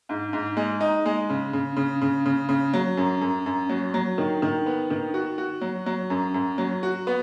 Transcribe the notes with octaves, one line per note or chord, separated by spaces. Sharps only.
G#2
G#2
G#3
D#4
G#3
C#3
C#3
C#3
C#3
C#3
C#3
F#3
F#2
F#2
F#2
F#3
F#3
D#3
D#3
B3
D#3
F#4
F#4
F#3
F#3
F#2
F#2
F#3
F#4
B3